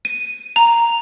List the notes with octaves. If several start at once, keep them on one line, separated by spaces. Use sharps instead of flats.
D#7
A#5